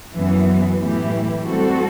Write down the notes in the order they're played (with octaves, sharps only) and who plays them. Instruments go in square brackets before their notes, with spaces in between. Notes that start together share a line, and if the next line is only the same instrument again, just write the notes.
[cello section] F#2 E3 B3
A2 E3 A3 E4 G4
G3 C4 F#4 A4